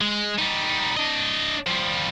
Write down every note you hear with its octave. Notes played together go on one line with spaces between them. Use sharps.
G#3
G3 D#4
D4 D#5
F3 G3